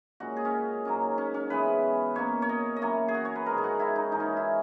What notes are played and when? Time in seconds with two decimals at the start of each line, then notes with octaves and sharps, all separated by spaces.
0.20 A#2 G#3 C#4 F#4
0.36 G#4
0.45 C#4
0.85 G#2 F#3 A#3 C#4
1.18 C#4
1.34 C#4
1.50 C#3 E3 G#3 B3 B4
2.15 B2 A#3 C#4 C#5
2.42 C#5
2.49 D#5
2.76 D#5
2.82 F#2 E3 A#3 C#4 C#5
3.08 G#4
3.14 F#4
3.25 C#5
3.36 B4
3.46 G#2 D#3 G#3 A#4
3.58 G#4
3.64 F#4
3.79 E4
3.96 D#4
4.12 G#2 E3 G#3 D#4
4.20 C#4
4.37 E4